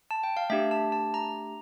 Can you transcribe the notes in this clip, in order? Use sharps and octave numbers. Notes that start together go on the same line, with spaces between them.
A5
G5
F5
A3 D4 G4 E5
A5
A5
A#5